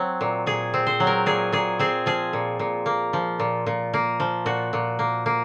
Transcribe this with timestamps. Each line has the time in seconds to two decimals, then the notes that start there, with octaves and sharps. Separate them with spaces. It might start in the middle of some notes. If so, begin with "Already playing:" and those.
Already playing: F#3 C4
0.21 A#2
0.46 A#2 G#4
0.74 C4
0.87 C5
1.00 F#3
1.07 A#4
1.26 A#2 G#4
1.52 A#2 G#4
1.79 C4 G#4
2.06 F3 G#4
2.33 A#2
2.59 A#2
2.86 A#3
3.13 F3
3.40 A#2
3.66 A#2
3.93 A#3
4.20 F3
4.46 A#2 F#4
4.73 A#2
4.99 A#3
5.26 A#3